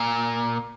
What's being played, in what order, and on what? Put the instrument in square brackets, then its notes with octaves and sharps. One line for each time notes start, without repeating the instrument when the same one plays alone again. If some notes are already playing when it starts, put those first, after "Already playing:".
Already playing: [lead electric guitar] A#2